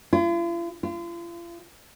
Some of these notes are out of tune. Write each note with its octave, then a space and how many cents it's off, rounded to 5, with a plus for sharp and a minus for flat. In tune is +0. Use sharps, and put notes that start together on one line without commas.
F4 -45
F4 -40